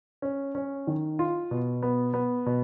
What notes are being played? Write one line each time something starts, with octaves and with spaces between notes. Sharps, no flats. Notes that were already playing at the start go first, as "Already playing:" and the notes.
C#4
C#4
D#3
F4
B2
B3
B3
B2